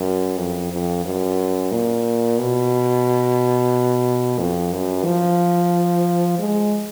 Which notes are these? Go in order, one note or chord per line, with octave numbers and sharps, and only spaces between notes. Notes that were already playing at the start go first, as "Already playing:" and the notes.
Already playing: F#2
F2
F2
F#2
A#2
B2
F2
F#2
F3
G#3